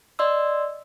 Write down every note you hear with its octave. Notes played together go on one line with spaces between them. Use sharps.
D5 D#5 C6 E6